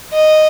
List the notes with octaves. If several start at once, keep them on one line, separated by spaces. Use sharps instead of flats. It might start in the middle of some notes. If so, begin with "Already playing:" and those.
D#5